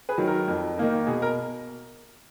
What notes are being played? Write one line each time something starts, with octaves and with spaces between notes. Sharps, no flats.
G#4 B4
D#3 F#3
A#4
F2
D#3 A#3 D#4
B2 G#4
A#4